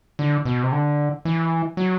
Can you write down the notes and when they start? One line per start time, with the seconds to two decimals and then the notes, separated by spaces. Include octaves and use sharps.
0.19 D3
0.45 B2
0.63 C3
0.72 D3
1.25 E3
1.77 F#3